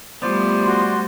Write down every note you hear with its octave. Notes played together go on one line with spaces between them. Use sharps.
F3 G3 A3 B3 C5 D5
F#4 C6